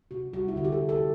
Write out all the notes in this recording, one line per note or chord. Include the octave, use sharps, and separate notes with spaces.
C3 F#4
G3 F#4
E4
D3 F#4
G4
A4
D3
A4